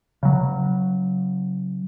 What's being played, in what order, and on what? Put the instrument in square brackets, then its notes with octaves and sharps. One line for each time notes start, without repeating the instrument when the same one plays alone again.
[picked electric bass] C#3 F#3